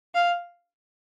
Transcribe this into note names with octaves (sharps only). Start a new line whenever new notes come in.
F5